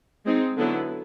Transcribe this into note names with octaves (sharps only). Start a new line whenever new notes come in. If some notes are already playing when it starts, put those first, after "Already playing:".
G#3 C4 D#4
D3 F#3 B3 E4